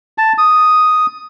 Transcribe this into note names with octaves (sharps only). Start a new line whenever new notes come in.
A5
D#6